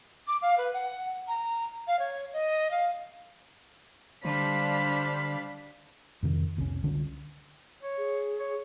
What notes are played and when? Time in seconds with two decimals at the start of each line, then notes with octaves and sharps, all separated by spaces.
0.27 D6
0.42 F5
0.57 B4
0.73 F#5
1.28 A#5
1.87 F5
1.99 C#5
2.33 D#5
2.71 F5
4.25 D3 G3 D4 C5 F5 B5
6.23 F2 C3 D#3
6.57 F1 C2 C3 C#4
6.83 C2 D3 C#4
7.83 C#5
7.98 G#4
8.40 C#5